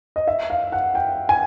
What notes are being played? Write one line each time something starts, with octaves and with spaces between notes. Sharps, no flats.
D#5
E5
F5
F#5
G5
G#5